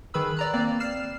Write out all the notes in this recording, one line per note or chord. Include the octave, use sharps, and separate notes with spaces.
D#3 G#4 B4 B5 E6
D5 A#5 F#6
A#3 C4 D5
F6 C7 E7